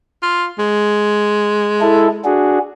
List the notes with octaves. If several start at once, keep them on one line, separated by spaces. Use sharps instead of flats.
F4
G#3
E4 A4
D4 F#4 G#4